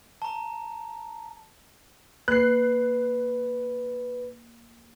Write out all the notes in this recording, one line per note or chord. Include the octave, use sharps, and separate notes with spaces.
A5 A#5
A#3 B4 F#6 C7